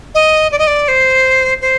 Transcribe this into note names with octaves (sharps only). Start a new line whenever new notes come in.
D#5
D5
D#5
D5
C5
C5